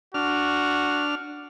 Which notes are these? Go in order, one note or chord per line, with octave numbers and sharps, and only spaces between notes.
D4 F#4 F6